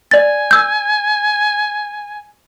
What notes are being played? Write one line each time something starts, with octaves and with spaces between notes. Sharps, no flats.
D5 G#5 A6
E6 G6